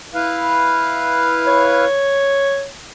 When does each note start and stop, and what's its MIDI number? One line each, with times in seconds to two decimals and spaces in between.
0.14 1.85 64
0.14 1.85 71
0.14 1.85 77
1.47 2.67 73